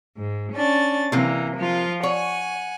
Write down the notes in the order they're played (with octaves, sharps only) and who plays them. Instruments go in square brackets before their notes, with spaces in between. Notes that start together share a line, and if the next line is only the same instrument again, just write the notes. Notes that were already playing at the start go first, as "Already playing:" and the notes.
[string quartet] G#2
C#4 D4 A6
[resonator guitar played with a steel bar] C3 A#3 [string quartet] E3
[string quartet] F3 F4
[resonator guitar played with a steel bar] C#5 [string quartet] F#5 G#5